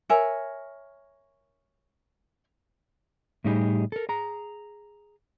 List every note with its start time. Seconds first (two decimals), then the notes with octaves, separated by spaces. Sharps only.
0.09 A#4 C#5 E5 G#5
3.44 A2 G3 D#4 E4 G4 G#4
3.92 A4 A#4
4.09 G#4 A#5